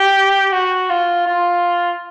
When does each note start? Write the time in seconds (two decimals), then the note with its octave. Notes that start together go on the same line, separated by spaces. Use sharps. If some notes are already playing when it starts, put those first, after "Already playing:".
Already playing: G4
0.52 F#4
0.89 F4
1.26 F4